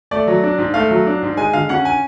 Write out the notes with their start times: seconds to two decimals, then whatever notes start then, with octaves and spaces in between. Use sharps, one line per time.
0.11 A3 D5
0.27 F#3
0.43 D4
0.58 G#2
0.74 A3 F5
0.91 F#3
1.07 D4
1.22 G#2
1.37 G#3 G#5
1.53 D3 F5
1.69 C#4 F#5
1.85 G#5